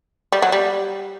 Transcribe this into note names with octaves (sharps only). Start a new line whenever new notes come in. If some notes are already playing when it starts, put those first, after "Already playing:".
G3
F#3
G3